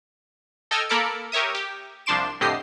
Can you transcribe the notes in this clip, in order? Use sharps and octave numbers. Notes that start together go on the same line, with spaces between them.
A4 D#5 G5 E6 F6 G#6
A#3 A4 A#4 B5 D6 C#7
G4 A#4 C#5 E5 D#6
G4
C2 F3 D4 C6 D6 E7
F2 A2 D3 G4 D#5 C7